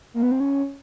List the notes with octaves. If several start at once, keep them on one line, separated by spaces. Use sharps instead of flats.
A#3
B3
C4
C#4